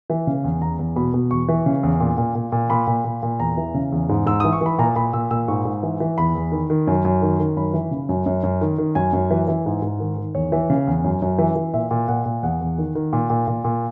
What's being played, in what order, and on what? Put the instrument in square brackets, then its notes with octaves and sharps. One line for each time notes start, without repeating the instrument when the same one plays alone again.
[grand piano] E3
C#3
E2
E2 A#5
E2
B2 B5
B2
E2 C#6
E3
C#3
E2
A#2
A#2
A#2
A#2
A#2 B5
A#2
A#2
A#2
E2 A#5
E3
C#3
E2
G#2
G#2 E6
E3 D#6
C#6
E3 B5
A#2 A#5
A#2 B5
A#2 E6
A#2 E6
G#2 C#6
G#2
E3
E3
E2 B5
E2
D#3
D#3
F#2
F#2
D#3
D#3
F#2 B5
E3
C#3
F#2
F#2
F#2
D#3
D#3
F#2 G#5
F#2
E3
E3
G#2
G#2
D#3
D#3
E2 C#5
E3
C#3
E2
F#2
F#2
E3
E3
A#2 E5
A#2
A#2 F#5
A#2
E2 F#5
E2
D#3
D#3
A#2
A#2
A#2
A#2